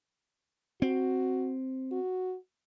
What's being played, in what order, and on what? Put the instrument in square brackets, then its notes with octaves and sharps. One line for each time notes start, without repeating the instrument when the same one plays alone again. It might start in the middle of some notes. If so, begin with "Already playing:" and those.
[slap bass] C4 [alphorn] F#4
[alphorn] F#4